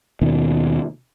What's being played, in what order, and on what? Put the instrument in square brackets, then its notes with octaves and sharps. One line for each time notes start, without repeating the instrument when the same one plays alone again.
[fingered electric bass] D#2 B2 D#3